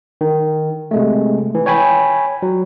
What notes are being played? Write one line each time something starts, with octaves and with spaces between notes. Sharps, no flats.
D#3
C3 G#3 A3
E3
C#5 G5 G#5 B5
F#3